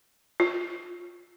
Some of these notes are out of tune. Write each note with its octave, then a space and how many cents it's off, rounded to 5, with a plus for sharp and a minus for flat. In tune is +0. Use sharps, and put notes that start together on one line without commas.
F4 +10